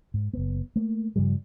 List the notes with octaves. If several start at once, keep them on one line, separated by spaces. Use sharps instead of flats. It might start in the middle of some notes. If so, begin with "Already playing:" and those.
G#2
F#1 B3
A3 A#3
G2 C#3 F3 G3